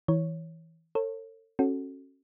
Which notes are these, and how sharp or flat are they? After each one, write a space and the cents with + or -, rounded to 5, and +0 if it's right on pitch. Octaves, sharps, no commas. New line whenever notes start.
E3 -20 C#5 +0
A4 +40 C#5 -30
C#4 -25 F#4 +0 A4 +0